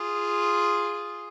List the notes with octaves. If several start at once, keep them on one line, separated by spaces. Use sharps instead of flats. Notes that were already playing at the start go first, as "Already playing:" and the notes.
Already playing: F4 G#4